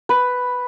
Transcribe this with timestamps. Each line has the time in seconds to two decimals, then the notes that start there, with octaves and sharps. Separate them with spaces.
0.09 B4